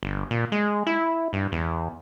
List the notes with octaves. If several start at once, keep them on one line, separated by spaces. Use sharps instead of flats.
G1
A#2
G#3
E4
G2
E2